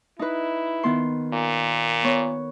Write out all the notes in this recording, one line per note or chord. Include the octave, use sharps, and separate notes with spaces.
D#4 E4 B4
D#3 B3 C6
A#2
B3 C#5